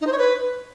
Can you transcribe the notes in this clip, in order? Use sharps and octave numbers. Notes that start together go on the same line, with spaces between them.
D#4
C5
C#5
B4